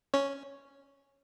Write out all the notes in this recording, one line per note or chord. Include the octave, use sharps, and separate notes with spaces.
C#4 C#5